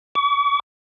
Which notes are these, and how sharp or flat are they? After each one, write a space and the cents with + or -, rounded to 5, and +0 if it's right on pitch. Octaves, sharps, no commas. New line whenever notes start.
C#6 +45